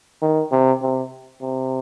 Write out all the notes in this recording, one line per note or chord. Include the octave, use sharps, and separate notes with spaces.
D#3
C3
C3
C3